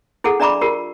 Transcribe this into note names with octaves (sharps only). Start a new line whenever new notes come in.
E4 G#4 A4 F#5
D4 D5 E5 A#5 B5 D6
F4 G4 A#4